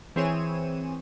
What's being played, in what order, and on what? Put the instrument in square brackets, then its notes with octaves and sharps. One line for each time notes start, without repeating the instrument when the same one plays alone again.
[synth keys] E3 C4 G#4 C#5 D#7 E7